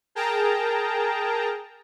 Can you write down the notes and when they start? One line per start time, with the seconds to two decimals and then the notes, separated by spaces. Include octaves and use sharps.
0.15 G#4 A#4 G5 A5 A#5